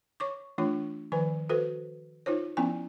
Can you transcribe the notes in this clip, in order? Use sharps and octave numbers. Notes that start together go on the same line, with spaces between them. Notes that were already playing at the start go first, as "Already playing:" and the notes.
C#5 C#6 D6
E3 A3 D4 F4 C#5
D#3 F3 B4 G#5
F#4 A4 B4 C5
D#4 F4 C5 C#5
F3 B3 C#4 E4 G#5